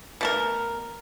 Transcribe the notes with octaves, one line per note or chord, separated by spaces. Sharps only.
B2 A3 A#4